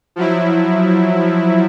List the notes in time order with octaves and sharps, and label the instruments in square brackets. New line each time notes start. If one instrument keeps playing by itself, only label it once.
[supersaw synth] F3 F#3 E4